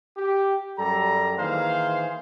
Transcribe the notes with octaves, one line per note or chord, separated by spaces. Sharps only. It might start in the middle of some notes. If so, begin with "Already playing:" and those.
G4
F#2 G3 A4 A#5
D#3 E3 A#3 G#4 C5 F5